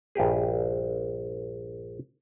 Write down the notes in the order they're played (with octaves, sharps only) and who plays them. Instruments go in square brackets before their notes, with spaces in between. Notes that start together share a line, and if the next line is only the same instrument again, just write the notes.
[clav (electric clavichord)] A#1 G2 G4 G#4